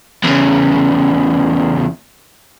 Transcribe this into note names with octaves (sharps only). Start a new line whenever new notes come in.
E2 C#3